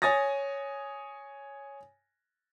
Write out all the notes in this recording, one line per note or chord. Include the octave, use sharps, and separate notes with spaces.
C#5 G#5 D#6 A6 A#6